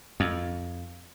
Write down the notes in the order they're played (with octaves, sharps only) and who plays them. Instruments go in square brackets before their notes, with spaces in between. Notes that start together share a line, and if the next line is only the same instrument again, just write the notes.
[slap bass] F2